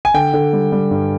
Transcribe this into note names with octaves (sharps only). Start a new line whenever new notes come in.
G#5
D3 G5
D3
G3
G3
G2